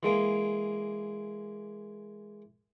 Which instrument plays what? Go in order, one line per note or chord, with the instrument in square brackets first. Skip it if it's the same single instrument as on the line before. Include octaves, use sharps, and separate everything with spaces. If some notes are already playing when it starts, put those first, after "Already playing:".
[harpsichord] E3 G#3 A#3